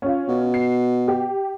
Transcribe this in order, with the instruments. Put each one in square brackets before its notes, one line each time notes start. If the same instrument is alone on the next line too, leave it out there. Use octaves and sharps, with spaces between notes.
[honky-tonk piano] C#4 F4
[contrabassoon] B2
[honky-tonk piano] C7
G4